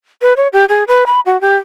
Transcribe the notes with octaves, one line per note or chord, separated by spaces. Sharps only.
B4
C#5
G4
G#4
B4
B5
F#4
G4